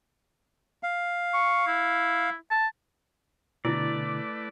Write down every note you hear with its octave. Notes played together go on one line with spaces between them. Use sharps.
F5
C#6
E4
A5
B2 D3 A3 E4 B4 D5